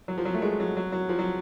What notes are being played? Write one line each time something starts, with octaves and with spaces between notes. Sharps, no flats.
F#3
F3
F#3
A3
G#3
F#3
F#3
F#3
F3
F#3